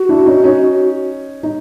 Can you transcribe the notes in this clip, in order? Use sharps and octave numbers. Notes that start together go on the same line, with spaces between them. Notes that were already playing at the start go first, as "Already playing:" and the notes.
Already playing: F#4
D4 E4
C#4 D#4
C#4 D#4
D#4